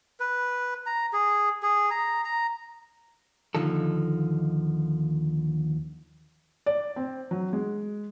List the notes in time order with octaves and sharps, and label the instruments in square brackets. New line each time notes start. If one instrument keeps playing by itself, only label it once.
[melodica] B4
A#5
G#4
G#4
A#5
A#5
[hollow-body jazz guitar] D#2 D3 F3 D#4 A4
[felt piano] D5
C4
F#3
G#3